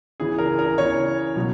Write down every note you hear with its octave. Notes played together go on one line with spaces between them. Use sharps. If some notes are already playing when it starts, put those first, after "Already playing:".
C#3 E3 G#4
A#4
A#4
C#3 E3 C#5
B2 F#3